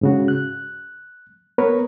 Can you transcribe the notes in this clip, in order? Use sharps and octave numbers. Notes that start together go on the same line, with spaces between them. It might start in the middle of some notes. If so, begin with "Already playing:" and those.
G#2 C#3 F#4
F#6
B3 A#4 B4 C#5